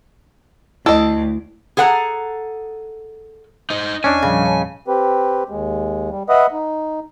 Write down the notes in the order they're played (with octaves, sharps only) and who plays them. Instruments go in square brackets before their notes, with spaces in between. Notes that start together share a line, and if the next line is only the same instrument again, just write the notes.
[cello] D2 [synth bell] E4 [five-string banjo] A4 D#5
[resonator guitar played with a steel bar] G#4 A4 F#5 G5 A#5
[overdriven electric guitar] D#4 C5 [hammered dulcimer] D#5
[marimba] E2 E6 [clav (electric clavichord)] C#4 D4 [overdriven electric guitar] G#5
[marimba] A#2 F3 G3 [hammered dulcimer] C#3
[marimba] C#5 A5
[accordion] C4 G4 B4
D#2 G#3
G3
B4 D#5 E5 F#5 B5 D#6
D#4